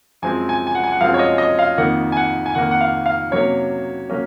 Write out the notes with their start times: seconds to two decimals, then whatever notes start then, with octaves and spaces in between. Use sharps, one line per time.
0.22 F#2 F3 G#3 C4 G#5
0.49 G#5
0.67 G#5
0.75 F#5
0.84 G#5
0.92 F#5
1.00 F#2 F3 G#3 C4 F5
1.14 C#5
1.19 D#5
1.38 D#5
1.59 F5
1.78 F2 D#3 A#3 F#5
2.12 G#5
2.17 F#5
2.46 G#5
2.54 F2 D#3 A#3 F#5
2.71 F#5
2.81 F5
3.06 F5
3.31 C3 F#3 A#3 C#4 C#5
4.10 F#3 A#3 C#4